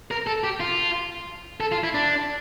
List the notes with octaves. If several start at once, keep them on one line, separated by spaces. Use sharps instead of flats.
A#4
A4
G4
F4
A4
F4
E4
D4